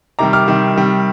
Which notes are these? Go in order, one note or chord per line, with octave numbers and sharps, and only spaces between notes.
C3 D#3 G3 A#5 D6
D6 F6
C3 D#3 G3
C3 D#3 G3